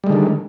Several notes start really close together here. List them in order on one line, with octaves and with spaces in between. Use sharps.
G3 G#3 D3 D#3